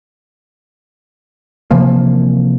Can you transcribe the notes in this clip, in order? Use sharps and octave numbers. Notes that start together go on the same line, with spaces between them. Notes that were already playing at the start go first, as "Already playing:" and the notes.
C3 E3 F3 A#3